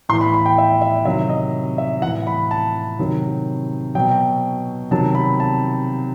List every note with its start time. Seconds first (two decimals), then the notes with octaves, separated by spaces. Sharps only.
0.09 A2 C6
0.12 E3
0.21 B5
0.34 B5
0.46 G5
0.58 E5
0.82 E5
1.05 C3 D#3 F#3 E5
1.29 D#5
1.78 E5
2.02 E3 F#5
2.06 A2
2.27 B5
2.51 A5
2.99 C3 D#3 F#3
3.95 B2 F#3 G5
4.91 C3 D#3 F#3 A5
5.15 B5
5.40 A5